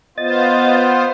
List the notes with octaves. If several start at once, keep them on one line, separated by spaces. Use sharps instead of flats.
B3 F4 C5 D#5 A6